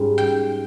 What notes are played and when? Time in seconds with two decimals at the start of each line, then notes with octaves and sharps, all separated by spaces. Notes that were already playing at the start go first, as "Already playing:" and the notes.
Already playing: G#2 G3 C#4
0.18 G5